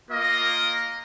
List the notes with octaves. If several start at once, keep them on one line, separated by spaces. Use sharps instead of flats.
A#3 F4 A#4 D#5